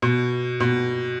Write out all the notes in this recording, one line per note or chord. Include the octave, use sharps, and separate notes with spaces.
B2
B2